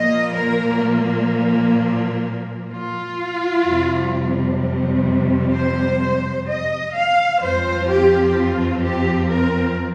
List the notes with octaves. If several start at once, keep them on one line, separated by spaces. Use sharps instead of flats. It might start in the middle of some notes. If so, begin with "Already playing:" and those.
Already playing: A#2 F3 A#3 D#5
A#4
F4
F2 C3 G3
C5
D#5
F5
F2 F3 C4 F4 C5
G4
F4
G4
A#4